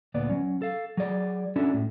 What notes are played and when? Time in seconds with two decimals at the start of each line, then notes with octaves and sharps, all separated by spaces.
0.14 D2 A#2 B3 D5
0.29 F#3 C#4
0.62 A4 F5
0.97 F#3 G#4 D5
1.56 C#4 D4 E4 F#4 A4
1.73 A2